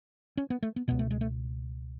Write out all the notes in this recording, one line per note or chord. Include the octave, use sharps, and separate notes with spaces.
C#4
B3
A3
B3
C#2 B2 B3
A3
G#3
A3